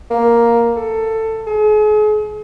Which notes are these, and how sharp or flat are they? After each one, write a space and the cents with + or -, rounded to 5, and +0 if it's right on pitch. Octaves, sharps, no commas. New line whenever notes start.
A#3 +5
A4 +15
G#4 +40